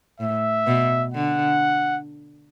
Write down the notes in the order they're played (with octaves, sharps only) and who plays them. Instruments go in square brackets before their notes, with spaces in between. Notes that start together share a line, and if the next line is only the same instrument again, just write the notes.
[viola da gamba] A2 [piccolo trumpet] E5
[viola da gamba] B2
[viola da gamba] D3 [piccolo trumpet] F#5